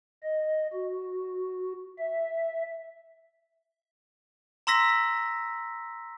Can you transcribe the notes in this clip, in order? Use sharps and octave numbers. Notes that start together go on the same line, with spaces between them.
D#5
F#4
E5
A#5 C6 E6 A#6 B6